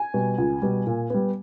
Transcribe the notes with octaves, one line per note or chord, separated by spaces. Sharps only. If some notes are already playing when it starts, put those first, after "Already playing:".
Already playing: G#5
B2 G3
C#2
B2 G3
A#2
G3 B3